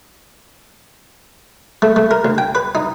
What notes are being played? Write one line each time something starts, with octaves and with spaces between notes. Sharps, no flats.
A3
A3
A#4
D2
G5
B4
D#4